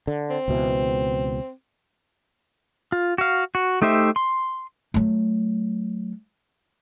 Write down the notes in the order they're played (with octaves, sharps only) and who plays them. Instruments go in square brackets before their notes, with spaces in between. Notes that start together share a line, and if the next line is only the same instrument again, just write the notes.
[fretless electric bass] D3
[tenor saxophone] C4
[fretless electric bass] C#2 B2 E3
[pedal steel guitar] F4
F#4 F5
F#4
A3 D#4 G4 C5 E5
C6
[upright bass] F#3 A3